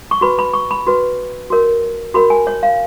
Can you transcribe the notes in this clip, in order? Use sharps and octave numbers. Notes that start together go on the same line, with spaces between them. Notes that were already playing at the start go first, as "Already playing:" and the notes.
C#6
F#4 B4 B5
B5
C#6
B5
F#4 B4
F#4 A#4 C#5
F#4 A#4 C#5 B5
G#5
C#5
F5